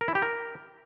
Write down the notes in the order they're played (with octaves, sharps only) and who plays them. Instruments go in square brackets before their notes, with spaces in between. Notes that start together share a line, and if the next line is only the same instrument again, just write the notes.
[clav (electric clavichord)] A#4
E4
G4
A#4